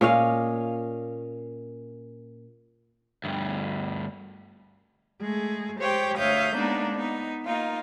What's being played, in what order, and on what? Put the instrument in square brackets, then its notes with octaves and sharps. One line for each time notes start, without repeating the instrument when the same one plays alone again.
[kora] A#2 C#4 D#5 F5
[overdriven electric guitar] D2 G2
[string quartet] G#3 A3 G#4
G#3 G4 C5 C#5 G5
D2 C#5 E5 F5 D#6 G6
G#3 A#3 B3 D4 D#4
B3 D#4
A#3 D#4 F4